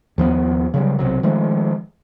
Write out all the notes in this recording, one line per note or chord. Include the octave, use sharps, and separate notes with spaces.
D#2 F3 A3 B3
C#3 F#3 G3
B1 C3 F#3
D#3 F3 G#3 A3